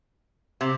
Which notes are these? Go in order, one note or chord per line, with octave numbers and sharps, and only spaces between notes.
C3